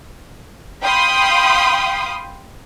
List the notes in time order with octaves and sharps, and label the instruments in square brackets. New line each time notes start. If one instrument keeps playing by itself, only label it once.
[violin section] F5 G5 B5 C6 D#6